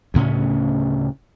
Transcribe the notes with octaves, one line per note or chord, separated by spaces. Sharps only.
D2 A2 C#3 C#4